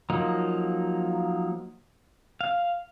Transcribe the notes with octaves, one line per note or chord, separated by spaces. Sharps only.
F3 F#3 A#3 D#4
F5